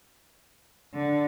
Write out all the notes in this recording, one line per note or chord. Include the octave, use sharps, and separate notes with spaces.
D3